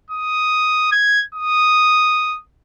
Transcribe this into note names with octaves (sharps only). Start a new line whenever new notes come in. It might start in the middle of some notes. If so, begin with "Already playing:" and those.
D#6
G#6
D#6